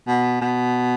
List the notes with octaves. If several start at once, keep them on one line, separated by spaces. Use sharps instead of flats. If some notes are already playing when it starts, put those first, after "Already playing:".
B2
B2